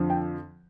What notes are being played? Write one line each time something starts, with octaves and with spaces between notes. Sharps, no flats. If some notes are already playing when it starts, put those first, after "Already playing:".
Already playing: F2 D3 F3
G5